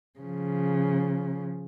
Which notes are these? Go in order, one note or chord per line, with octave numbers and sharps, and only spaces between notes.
C#3 F3